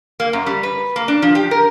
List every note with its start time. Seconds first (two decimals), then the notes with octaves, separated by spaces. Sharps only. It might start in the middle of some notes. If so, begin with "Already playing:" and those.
0.20 A#3
0.33 F#2
0.46 G3
0.63 B4
0.96 A#3
1.08 D4
1.22 F3
1.35 G4
1.51 A#4